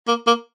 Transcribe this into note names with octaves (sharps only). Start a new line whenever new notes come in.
A#3
A#3